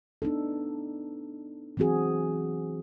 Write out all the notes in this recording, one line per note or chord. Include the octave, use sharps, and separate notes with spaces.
B3 D4 D#4 A4
E3 F#3 C4 F#4 G#4